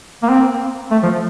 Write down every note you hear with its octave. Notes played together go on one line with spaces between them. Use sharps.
A#3
C4
A3
F3